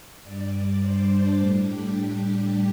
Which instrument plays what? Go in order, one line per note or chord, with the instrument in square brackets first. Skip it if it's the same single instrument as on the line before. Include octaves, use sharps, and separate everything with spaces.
[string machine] G2 G3 D5
C5
D4
A2 G3 D4
G4
G4